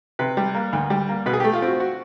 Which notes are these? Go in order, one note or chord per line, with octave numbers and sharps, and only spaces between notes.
C3 B4
G3
A#3
D2
G3
A#3
B2 B4
G#4
A3 G4
F4
C4 F#4
F#4